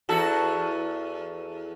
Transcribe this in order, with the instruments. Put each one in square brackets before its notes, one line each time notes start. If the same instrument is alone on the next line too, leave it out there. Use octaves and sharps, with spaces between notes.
[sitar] E2 F#4 A4